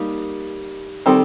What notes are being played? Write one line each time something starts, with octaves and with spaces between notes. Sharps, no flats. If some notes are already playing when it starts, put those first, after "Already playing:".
Already playing: G3 A#3 D#4
D#3 G3 C4 A4